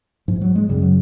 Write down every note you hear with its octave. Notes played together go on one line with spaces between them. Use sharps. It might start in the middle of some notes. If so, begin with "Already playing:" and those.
G#2 F3
F#3
G#3
F#2 C#3 G3
F#3